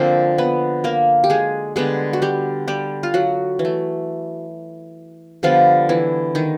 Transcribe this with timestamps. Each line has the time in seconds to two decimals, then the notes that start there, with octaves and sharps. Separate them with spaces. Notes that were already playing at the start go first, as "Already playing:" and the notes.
Already playing: D3 F3 A#3 C4 C5
0.38 B3 B4
0.84 A#3 A#4
1.24 G4
1.30 G#3 G#4
1.76 D3 G3 G#3 B3 G#4
2.13 F#4
2.22 G3 G4
2.68 G3 G4
3.03 F4
3.14 F#3 F#4
3.59 E3
3.65 A3
5.43 D3 F3 G3 B3 F4
5.89 E3 E4
6.35 D#3 D#4